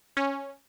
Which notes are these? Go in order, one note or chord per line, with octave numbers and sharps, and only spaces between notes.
C#4